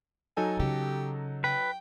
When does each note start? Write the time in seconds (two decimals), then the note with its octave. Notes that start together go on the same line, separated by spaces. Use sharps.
0.37 F#3 D#4 A4 G#5
0.59 C#3 G4
1.44 B4 G5